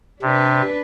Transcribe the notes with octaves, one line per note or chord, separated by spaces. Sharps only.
C3 D4 B4